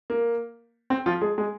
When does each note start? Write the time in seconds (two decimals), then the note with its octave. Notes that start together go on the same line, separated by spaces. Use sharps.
0.10 A#3
0.90 C4
1.06 F3 F4
1.21 G#3 G#4
1.38 G#3 G#4